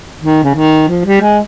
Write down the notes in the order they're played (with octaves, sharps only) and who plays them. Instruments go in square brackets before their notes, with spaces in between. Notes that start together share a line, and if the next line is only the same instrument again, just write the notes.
[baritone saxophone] D#3
C#3
D#3
F3
G3
G#3